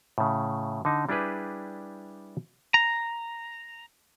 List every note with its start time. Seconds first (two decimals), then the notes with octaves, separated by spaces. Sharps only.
0.18 A2 C#3
0.85 D3 D#4
1.09 G3 D4 E4 G4 G#4 B4
2.74 A#5